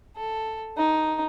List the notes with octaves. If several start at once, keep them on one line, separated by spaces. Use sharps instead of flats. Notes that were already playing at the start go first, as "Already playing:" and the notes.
A4
D#4